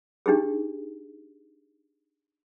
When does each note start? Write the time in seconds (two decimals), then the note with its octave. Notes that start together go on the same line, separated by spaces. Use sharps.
0.26 D4 D#4 G4 G#4